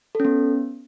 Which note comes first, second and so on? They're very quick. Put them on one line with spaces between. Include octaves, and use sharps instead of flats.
A4 C#4 B3